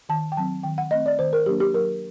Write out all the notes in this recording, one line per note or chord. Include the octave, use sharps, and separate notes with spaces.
D#3 A5
G5
F#3 C4 A5
D#3 G5
F#5
A3 C4 D#5
D5
D#3 C5
A#4
F#3 A#3 D4 G4
G4
F#3 A#4